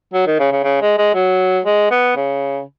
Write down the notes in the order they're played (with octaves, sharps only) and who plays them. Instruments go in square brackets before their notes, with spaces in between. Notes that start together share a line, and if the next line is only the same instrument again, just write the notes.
[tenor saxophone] F#3
D#3
C#3
C#3
C#3
G#3
G#3
F#3
G#3
B3
C#3